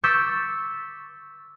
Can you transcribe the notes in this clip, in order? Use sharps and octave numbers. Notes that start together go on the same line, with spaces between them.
C#6 D6 E6 G6 A6 B6